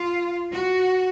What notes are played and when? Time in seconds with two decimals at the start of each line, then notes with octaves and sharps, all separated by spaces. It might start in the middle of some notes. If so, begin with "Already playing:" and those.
Already playing: F4
0.53 F#4